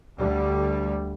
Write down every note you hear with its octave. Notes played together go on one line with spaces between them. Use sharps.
D2 D3 G3